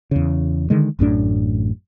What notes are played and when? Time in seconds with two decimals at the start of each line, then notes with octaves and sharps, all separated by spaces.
0.11 E2 C#3
0.70 D3 D#3 G#3
0.99 A1 F#2 A2 D4